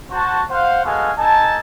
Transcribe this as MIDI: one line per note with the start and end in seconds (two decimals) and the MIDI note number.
0.11 0.42 66
0.11 0.42 72
0.11 0.42 81
0.50 0.84 72
0.50 0.84 77
0.50 0.84 78
0.85 1.11 56
0.85 1.11 59
0.85 1.11 66
0.85 1.11 69
0.85 1.11 77
0.85 1.11 80
1.19 1.60 63
1.19 1.60 69
1.19 1.60 80
1.19 1.60 81